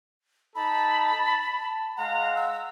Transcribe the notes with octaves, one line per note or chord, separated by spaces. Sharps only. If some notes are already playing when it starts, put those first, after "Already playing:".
D#4 A4 A5 B5
A5
G#3 F5 F#5 A#5
E6